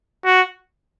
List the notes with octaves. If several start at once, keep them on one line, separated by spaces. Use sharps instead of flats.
F#4